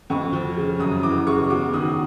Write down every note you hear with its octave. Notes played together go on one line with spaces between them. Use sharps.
F2 C#6
F3
C#3
F#2 D#6
E3 D6
C#3 C#6
E2 D6
D#3 D#6